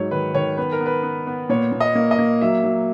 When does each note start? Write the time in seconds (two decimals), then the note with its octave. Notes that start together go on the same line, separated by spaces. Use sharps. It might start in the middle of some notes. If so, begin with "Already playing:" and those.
Already playing: G#2 F#3 C#5
0.11 D#3 B4
0.34 D#3 C#5
0.57 B3 B4
0.72 A#4
0.81 B3
0.86 B4
1.03 B3
1.27 B3
1.49 A#2 C#5
1.72 A#2
1.80 D#5
1.95 A#3
2.11 D#5
2.19 A#3
2.41 F#3 E5
2.64 F#3